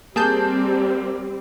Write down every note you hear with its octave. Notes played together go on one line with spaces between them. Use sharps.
G3 A#3 C4 G#4 A5 G6